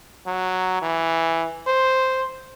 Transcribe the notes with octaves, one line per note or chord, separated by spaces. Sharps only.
F#3
E3
C5